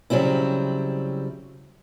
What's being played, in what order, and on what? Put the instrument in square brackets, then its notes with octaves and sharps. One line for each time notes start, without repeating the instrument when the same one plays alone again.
[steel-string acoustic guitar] C#3 F#3 G3 C4 E4